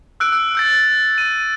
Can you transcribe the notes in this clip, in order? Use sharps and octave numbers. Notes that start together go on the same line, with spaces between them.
E6 F#6 D7
E6
E6 G6 A6
D#7